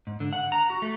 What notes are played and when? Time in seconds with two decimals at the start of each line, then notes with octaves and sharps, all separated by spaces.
0.07 G#2
0.20 D3
0.33 F#5
0.52 A#5
0.70 F#4
0.82 A3